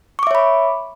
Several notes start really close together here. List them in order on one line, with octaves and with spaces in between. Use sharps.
C#6 D6 E5 C#5 B5